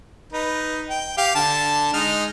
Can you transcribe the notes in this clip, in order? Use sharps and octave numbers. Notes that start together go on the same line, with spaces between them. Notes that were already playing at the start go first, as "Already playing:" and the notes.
D#4 B4
G5
G4 F5
D3 A5
G#3 D#4 F6